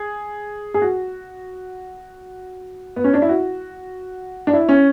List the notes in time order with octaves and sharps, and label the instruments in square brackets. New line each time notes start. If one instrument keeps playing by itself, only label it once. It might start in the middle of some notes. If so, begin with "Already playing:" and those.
Already playing: [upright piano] G#4
G#4
F#4
B3
C#4
D4
E4
F#4
D4
E4
C#4